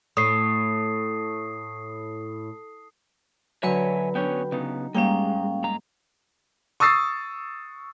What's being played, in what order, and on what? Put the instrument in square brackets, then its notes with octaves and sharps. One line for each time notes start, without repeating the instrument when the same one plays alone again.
[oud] A2 [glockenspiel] D#6 C7
[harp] D3 F#3 [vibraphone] B4 B5 [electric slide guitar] C#5 E5 G#5
[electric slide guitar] B3 C#4 C#5 [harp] D4 G5
[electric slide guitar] C#3 B3 [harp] D#4
[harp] G#2 G3 A#3 [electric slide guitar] G#3 [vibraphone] C#4 F5 G5
[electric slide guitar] G#3 A#5
[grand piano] C#6 D#6 E6 A6 C7